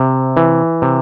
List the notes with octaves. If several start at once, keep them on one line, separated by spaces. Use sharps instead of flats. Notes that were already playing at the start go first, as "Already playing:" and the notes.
Already playing: C3
E3
C3